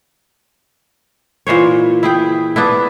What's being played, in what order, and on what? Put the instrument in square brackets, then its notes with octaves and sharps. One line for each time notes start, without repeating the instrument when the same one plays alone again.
[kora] A#2 E3 C5 C#5
E4 G#4 G5
B3 D4 E4